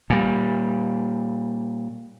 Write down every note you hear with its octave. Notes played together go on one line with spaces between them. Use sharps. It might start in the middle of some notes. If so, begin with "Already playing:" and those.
A#2 G3